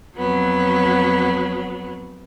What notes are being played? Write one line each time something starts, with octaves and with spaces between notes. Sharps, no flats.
F2 F#3 B3